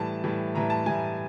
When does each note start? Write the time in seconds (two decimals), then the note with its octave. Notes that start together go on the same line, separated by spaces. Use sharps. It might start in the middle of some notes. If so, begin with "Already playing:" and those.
Already playing: A2 E3 G3 A5
0.24 A2 E3 G3
0.55 A2 E3 G3 A#5
0.70 A5
0.86 A2 E3 G3 G#5